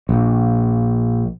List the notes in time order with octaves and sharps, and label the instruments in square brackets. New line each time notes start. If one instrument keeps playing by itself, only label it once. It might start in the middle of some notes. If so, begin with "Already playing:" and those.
[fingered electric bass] A#1